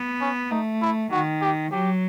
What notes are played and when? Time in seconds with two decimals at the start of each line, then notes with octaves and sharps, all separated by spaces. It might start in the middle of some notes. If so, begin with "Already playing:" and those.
Already playing: B3
0.21 C#4
0.51 A3 D#4
0.82 E4
1.11 D#3 F#4
1.42 G4
1.72 F#3 G4